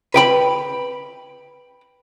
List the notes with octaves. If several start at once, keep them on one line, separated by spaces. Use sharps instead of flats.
B4 G5 B5